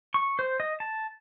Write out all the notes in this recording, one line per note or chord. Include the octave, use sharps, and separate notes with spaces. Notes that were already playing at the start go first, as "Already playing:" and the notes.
C#6
C5
D#5
A5